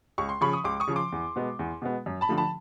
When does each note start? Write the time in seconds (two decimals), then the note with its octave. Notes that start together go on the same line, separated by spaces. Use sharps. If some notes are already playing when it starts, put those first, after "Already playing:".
0.18 C#2 C#6
0.29 C6
0.41 C#3 F3 B5 C#6
0.53 D#6
0.64 C#2 C6 D6
0.80 C#6 D#6
0.88 C#3 F3
0.96 C6 D6
1.12 E2
1.36 B2 G#3 B3
1.59 E2
1.82 B2 G#3 B3
2.06 F#2
2.21 A5 B5
2.29 D3 F3 A3
2.37 A5 B5